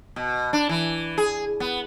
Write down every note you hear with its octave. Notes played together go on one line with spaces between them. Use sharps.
B2
D4
E3
G#4
B3